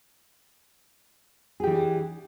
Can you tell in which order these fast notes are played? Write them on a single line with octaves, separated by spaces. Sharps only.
G#4 G4 E3 D4